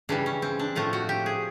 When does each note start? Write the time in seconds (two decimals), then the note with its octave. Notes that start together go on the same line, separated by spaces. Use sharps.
0.09 C#3 E3 G3 D4
0.26 C#4
0.42 C4
0.59 D4
0.75 A2 F3 A3 F4
0.93 F#4
1.09 G4
1.26 G#4